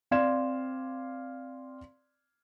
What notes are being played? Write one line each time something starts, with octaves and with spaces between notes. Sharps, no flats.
C4 D5 F5 C6 G#6 E7